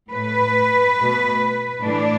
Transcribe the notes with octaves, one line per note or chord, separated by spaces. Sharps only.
A2 A3 B4
B2 A3
A2 E3 A3 D4